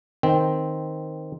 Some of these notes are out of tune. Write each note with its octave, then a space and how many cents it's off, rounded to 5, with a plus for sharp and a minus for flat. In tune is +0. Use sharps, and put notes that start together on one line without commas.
D#3 +0 C4 +0